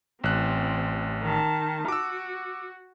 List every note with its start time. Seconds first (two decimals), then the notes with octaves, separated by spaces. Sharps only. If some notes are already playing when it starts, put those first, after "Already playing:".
0.24 A1 C4 F#6
1.23 D#3 A5
1.88 F#4 D6 E6